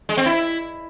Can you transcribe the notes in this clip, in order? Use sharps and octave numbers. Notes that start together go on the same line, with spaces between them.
G#3
C4
E4